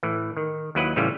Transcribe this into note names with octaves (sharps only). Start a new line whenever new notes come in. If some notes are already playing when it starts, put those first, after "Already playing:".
A2 E3
D#3
D#2 F#3 E4 B4 D#5 F#5
A2 C#3 E3 G3 C#4 F4